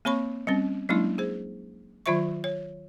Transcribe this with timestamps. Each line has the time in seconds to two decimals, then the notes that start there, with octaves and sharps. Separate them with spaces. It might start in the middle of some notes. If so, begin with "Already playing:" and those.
0.05 A#3 C4 C#5 B5 C#6
0.47 G3 C4 C#4
0.89 F#3 G#3 A#3 C#4 D4 E4
1.18 G#4 C5
2.06 D#3 F#3 F4 C5 E5 C#6
2.44 C#5